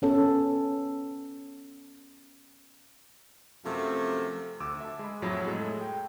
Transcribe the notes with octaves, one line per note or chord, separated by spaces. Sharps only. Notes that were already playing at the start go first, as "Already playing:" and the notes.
B3 C#4 A4
F#2 C3 F3 A3
D2 D6 E6
E5 A5
G#3 B5
F2 A2 F#3 A3 E4
G#3 A3 A4
G5